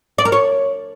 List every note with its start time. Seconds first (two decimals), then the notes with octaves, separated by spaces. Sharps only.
0.18 D5
0.25 A#4
0.32 C#5